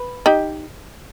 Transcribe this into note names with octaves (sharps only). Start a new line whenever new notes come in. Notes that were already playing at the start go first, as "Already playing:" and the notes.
Already playing: B4
D#4 G4